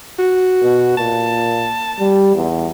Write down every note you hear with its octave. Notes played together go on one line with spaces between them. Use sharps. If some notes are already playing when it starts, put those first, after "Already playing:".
F#4
B2
A#2 A5
G3
E2